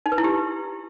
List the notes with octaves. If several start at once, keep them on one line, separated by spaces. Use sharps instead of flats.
D#4
B4
E4
G4